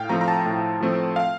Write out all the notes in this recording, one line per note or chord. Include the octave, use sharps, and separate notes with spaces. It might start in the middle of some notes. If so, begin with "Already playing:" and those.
Already playing: A2 F5 G5
F3 A3 C4 A#5
A#5
A5
A2
F3 A3 C4
F5